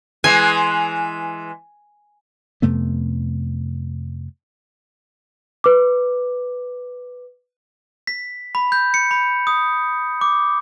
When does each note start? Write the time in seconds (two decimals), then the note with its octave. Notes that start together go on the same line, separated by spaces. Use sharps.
0.24 E3 G#3 G#5
2.62 F2 C3 A3 B3
5.64 B4 D6
8.07 B6
8.55 B5
8.72 G6
8.94 C#7
9.11 B5
9.47 D#6
10.21 D6